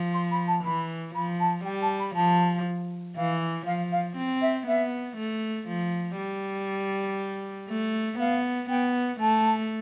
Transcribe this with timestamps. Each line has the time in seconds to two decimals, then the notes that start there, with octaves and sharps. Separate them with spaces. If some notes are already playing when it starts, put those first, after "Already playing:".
Already playing: F3
0.14 C6
0.31 B5
0.47 A5
0.64 E3 B5
1.14 F3 B5
1.39 A5
1.65 G3 G5
1.82 A5
1.99 B5
2.15 F3 A5
3.16 E3 F5
3.66 F3 F5
3.91 F5
4.17 C4
4.41 E5
4.67 B3 E5
5.17 A3
5.68 F3
6.18 G3
7.69 A3
8.19 B3 F5
8.69 B3 G5
9.20 A3 A5